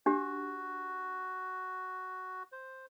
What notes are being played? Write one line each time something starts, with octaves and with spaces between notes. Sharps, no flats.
D4 F#4 G4
C5